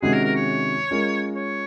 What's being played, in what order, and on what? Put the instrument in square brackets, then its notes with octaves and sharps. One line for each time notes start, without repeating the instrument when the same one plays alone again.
[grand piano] C3 D#3 G#3 C#4 F#4 [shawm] G#4
[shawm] A#4
A#4
C#5
[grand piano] G#3 C#4 F4 A#4
[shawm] C#5